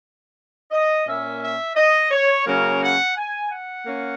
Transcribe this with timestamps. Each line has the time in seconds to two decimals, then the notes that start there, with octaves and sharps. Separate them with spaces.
0.71 D#5
1.06 A#2 A#3 C#4 E5
1.41 E5
1.76 D#5
2.11 C#5
2.45 C#3 F#3 A#3 C#4 A#4
2.80 F#5
3.15 G#5
3.49 F#5
3.85 A#3 C#4